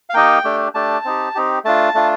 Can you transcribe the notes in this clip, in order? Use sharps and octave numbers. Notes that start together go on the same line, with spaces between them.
F5
A#3 D#4 G4 G5
A3 D4 G4
A3 D4 G4 A5
C4 D#4 G4
C4 D#4 G4
A3 D4 F4 A5
A3 D4 F4